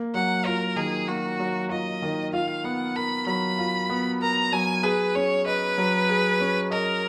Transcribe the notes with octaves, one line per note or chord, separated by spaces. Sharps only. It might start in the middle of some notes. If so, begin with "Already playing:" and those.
Already playing: A#3
F#3 F#5
F4 A#4
D#3 G#4
A#3 F#4
F#3
F4 D#5
D#3
F4 F5
B3 F#5
A#4 B5
F#3 B5
F4
B3
A#4 A#5
F#3 G#5
G#4 B4
C#4 C#5
B4 D#5
F#3
G#4
C#4
A#4 D#5